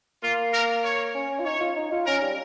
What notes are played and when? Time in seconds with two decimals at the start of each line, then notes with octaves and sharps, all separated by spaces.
0.23 A#3 F4
0.54 A#4
0.84 C#5
1.15 C#4
1.39 F4
1.45 D#4 C#5
1.60 F4
1.76 D#4
1.92 F4
2.06 C#4 A#4
2.22 G3